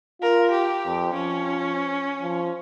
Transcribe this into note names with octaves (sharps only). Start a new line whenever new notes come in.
F4 A#4
G4
F2
F3 C#4
F3